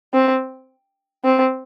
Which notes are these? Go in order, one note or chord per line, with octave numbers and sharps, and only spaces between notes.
C4
C4